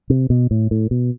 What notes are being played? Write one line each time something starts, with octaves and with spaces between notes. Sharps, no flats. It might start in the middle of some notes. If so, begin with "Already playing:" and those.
C3
B2
A2
A2
B2